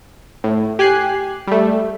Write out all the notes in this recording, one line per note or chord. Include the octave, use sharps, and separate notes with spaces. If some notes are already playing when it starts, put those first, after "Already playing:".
A2
G4 G#5 F#6 C7
G3 A3